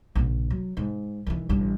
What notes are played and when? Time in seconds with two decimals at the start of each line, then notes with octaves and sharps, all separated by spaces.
0.15 A#1 C#3
0.50 F#3
0.77 G#2
1.26 D#3 E3
1.49 A1 G2